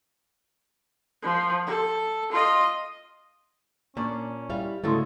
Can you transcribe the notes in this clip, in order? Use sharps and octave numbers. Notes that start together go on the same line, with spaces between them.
F3
A4
F4 D#5
A#2 C#4 D4
G3 E4 F5
D2 G#2 C#3 A3 E4 A#4 C6